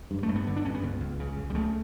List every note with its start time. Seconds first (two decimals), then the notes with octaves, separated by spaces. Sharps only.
0.11 G2
0.23 A3
0.29 G2
0.36 B3
0.47 D3
0.56 D4
0.65 G2 C#4
0.75 B3
0.83 C#2
1.01 C#2
1.20 C#3
1.37 C#2
1.50 G3
1.55 C#3 A3